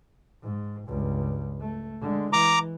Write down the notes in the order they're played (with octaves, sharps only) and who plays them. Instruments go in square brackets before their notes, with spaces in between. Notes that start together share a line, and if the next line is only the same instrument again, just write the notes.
[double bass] G#2
C#2 G2
A3
D3 G#3
[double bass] E3 [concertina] A#5 D6